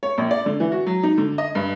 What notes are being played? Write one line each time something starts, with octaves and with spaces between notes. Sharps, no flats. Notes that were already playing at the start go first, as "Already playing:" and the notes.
C#5
A#1
D5
D3
E3
F#4
F#3
D#4
D3
D#5
G2